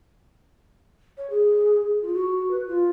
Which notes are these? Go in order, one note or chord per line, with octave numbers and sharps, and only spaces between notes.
C#5
G#4
G#4
F4
F#4
B4
F4